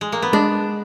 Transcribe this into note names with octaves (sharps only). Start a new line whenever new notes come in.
G#3
A#3
B3
G#3 D4